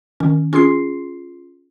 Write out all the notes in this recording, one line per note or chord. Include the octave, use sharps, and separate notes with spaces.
D#3 C#4
C#4 F4 G#4 C6 C7